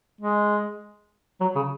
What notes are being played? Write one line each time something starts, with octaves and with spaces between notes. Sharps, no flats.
G#3
F#3
C#3